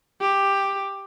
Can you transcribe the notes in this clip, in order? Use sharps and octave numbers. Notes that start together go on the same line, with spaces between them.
G4